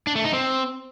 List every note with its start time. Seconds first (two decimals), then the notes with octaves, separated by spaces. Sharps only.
0.07 D4
0.16 A3
0.24 D#4
0.33 C4